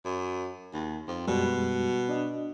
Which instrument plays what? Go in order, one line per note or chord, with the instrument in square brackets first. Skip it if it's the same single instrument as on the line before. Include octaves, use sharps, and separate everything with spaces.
[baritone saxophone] F#2
D#2
F2
[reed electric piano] F#2 G3 G#3 [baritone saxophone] B2
[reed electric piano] D4 D#5